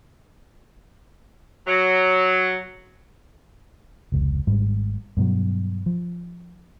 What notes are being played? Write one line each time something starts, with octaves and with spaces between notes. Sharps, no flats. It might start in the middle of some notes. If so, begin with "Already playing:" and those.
F#3
F1 C#2
G#1 G#2 G3
G2 B2 F#3
F3